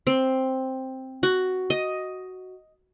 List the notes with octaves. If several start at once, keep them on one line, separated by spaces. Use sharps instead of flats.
C4
F#4
D#5